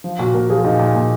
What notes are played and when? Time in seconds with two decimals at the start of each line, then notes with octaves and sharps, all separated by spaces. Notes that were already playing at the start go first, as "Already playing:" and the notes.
0.04 F3
0.19 A#2 F#4
0.34 A#2 A#4
0.49 F3 G#4
0.65 A#2 D#4
0.79 A#2
0.95 A#2